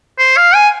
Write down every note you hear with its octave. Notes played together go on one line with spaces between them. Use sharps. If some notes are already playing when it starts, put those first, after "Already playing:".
C5
F5
G#5